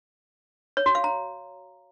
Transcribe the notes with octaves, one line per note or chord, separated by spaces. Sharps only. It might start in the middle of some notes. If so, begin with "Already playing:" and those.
C#5
F#4
F5
A#5